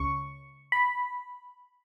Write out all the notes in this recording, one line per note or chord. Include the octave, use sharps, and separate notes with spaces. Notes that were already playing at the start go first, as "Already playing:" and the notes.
Already playing: C#2 C#3 C#6
B5